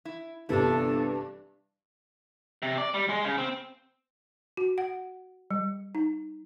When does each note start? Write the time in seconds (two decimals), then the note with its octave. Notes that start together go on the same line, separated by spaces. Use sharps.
0.05 E4
0.49 G1 G2 C3 E3 D4 E4 A4
2.62 C3
2.78 D5
2.94 G3
3.09 G#3
3.24 C#3
3.38 C4
4.57 F#4
4.78 F#5
5.51 G3
5.95 D#4